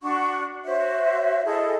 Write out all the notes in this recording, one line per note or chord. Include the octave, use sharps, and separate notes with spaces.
D4 F#4 F#5 C#6
F#4 C5 C#5 E5
E4 G#4 A4 D#5